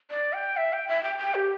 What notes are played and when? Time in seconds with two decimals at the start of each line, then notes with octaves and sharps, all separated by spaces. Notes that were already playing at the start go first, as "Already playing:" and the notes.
0.10 D5
0.33 G5
0.57 E5
0.73 G5
0.88 E5
1.03 G5
1.18 G5
1.35 G4